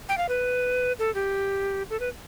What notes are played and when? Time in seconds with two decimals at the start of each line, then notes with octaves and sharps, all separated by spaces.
0.09 G5
0.18 F5
0.29 B4
0.99 A4
1.15 G4
1.90 A4
2.00 B4